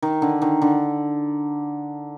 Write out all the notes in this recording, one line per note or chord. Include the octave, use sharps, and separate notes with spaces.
D#3
D3
D#3
D3